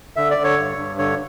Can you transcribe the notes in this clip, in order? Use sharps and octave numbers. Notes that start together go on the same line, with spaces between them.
D3 E5
D5
D3
C#5
G2
G2
D3 C#5